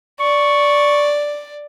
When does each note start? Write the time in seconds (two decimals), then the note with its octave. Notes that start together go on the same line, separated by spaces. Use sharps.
0.20 D5 C#6